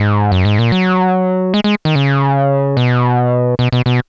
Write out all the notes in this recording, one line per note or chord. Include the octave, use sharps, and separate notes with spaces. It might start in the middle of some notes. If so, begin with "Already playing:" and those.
Already playing: G#2
F#2
G#2
A#2
F#3
G#3
G#3
D#3
C#3
B2
B2
B2
B2